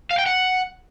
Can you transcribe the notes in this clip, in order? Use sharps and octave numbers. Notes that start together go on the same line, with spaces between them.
F5
G5
F#5